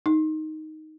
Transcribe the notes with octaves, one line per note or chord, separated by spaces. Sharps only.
D#4